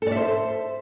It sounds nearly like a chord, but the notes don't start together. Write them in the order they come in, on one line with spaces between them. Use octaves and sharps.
A4 D5 E5 C5